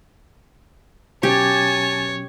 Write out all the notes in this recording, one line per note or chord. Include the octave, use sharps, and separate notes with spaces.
B2 F#3 C#4 G4 C#5 G#5 A5